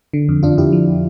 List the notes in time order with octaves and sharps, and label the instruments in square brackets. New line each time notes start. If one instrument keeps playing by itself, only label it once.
[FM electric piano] D3
F2
F2 D4 F4
F2 E4 G4
F3